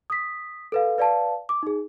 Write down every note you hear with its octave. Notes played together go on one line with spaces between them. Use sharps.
D#6 B6
A4 B4 F5
B4 D5 F5 A5
D6
D#4 G#4